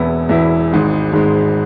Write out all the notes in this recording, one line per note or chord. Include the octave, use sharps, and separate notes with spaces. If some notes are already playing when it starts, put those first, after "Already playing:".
Already playing: E1 E2 E3 B3 E4
E1 E2 E3 B3 E4
G#1 G#2 G#3
G#1 G#2 G#3